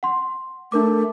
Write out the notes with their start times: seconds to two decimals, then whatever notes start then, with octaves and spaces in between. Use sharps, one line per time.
0.03 F#5 C6
0.72 A3 D4 A#4 D6